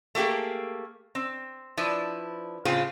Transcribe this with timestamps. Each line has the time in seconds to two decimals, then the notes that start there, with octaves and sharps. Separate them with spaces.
0.15 A3 A#3 G4 G#4
1.15 C4
1.77 F3 D4 E4 B4
2.65 A2 C#3 C4 F4 G#4